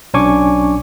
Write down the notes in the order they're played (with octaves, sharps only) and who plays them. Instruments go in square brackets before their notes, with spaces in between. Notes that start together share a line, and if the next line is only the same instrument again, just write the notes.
[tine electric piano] B1 C#4 D4 G#5 C#6 D6